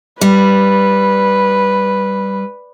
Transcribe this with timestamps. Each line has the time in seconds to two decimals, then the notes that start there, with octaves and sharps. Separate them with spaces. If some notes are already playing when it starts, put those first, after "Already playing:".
0.21 G3 B4